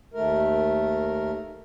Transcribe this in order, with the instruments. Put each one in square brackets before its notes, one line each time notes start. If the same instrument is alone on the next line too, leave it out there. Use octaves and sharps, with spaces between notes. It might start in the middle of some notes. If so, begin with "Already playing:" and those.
[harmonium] D#2 A3 A#4